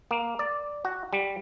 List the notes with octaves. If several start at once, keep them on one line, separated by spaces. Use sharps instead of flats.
A#3
D5
F#4
G3